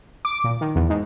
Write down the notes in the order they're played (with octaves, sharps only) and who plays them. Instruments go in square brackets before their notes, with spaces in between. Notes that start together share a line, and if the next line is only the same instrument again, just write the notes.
[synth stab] D6
A#2
D#3
E2
G#2